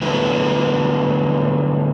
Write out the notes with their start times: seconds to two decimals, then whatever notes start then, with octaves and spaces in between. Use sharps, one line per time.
0.01 D3 F#3 G3 A3 B3 E4